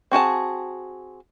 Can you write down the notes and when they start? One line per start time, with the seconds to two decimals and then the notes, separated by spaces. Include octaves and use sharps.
0.12 C4 F#4 G#4 A5